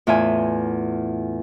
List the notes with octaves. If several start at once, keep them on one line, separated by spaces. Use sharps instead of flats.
E2 A2 F4 E5 G#5